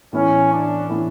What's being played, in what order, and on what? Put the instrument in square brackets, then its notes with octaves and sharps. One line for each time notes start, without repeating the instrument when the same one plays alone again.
[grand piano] A2 E3 B3 E4 [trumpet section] C#4
[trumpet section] D4
[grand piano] A2 E3 B3 E4